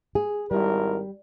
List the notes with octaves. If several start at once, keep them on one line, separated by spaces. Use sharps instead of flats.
G#4
G#1 G3 E4 A#4